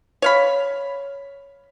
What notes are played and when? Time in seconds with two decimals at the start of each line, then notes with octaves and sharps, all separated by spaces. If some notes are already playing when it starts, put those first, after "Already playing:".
0.22 C#5 F5 B5